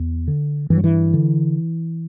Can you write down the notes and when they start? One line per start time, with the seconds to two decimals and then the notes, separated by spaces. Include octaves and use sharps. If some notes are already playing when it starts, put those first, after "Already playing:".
Already playing: E2
0.28 D3
0.70 G2 E3
0.77 F#3
0.84 E3
1.13 D3